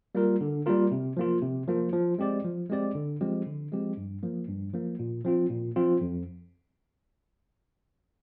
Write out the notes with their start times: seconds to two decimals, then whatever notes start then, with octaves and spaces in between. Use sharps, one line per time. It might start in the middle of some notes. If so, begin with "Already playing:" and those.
0.15 G3 A#3 F4 A#4
0.41 D3
0.66 G3 A#3 F4 A#4
0.91 C3
1.17 F3 A#3 F4
1.42 C3
1.68 F3 A#3 F4
1.93 F3
2.18 G#3 C4 G4 D5
2.44 F3
2.70 G#3 C4 G4 D5
2.95 D3
3.21 F3 G#3 C4 G4
3.47 D3
3.72 F3 G#3 C4 G4
3.97 G2
4.23 F3 A#3
4.48 G2
4.73 F3 A#3
4.99 A#2
5.25 F3 C4 F4
5.50 A#2
5.76 F3 C4 F4
6.01 F2